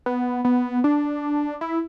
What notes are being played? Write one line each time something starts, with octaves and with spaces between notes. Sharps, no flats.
B3
B3
D4
E4